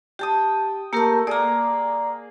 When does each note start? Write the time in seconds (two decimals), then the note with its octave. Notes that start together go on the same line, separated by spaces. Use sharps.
0.19 G4 G5 A5 D#6
0.93 A3 A#3 G4 A4 A#4
1.27 A#3 G#4 D5 A#5